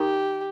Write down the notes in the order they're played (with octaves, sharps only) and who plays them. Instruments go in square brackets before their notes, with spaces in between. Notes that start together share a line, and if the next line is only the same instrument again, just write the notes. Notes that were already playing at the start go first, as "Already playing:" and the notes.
Already playing: [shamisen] D#3 [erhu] G4